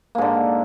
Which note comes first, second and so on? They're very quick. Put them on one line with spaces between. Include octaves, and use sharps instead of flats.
A#3 G#2 D3